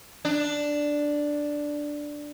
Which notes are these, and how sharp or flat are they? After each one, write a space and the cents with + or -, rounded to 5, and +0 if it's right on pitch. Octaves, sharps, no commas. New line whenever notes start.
D4 +0